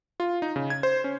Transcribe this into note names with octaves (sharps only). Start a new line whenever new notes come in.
F4
D#4
C#3
G#6
C5
C#4